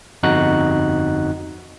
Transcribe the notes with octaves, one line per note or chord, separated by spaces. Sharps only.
G1 F2 D#4 F#4 F#6